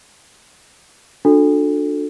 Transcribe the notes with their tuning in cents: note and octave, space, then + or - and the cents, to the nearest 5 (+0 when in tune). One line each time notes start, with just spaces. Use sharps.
D4 +10 F#4 -40 A4 +0